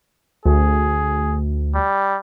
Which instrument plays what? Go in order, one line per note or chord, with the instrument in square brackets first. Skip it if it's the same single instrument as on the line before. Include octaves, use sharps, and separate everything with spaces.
[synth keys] D2 [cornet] G#4
[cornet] G3